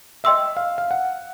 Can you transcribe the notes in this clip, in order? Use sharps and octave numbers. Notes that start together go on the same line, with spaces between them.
D#5 E5 G5 C6 E6
F5
F5
F#5